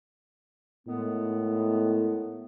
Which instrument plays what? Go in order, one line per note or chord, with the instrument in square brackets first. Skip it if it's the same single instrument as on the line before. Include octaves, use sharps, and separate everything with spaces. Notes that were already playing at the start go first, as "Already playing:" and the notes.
[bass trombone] A2 [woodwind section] D#3 G#3 B3